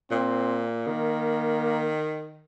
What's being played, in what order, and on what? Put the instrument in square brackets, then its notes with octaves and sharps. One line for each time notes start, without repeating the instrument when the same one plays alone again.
[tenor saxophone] A#2 [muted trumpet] C4
[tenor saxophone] D#3 [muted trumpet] A#3